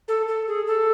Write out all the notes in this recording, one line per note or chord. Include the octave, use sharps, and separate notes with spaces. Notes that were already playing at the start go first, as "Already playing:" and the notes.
A4
A4
G#4
A4